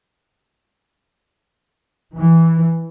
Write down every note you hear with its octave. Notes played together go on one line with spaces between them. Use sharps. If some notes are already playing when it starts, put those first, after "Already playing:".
E3